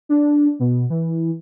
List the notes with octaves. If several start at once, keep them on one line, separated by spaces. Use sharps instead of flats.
D4
B2
E3